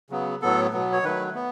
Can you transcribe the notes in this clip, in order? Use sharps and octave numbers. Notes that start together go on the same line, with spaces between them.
C#3 F#3 B3
A2 F#3 B3 A4
B2 F#3 B3
C#5
D#3 F#3 A3 B4
B3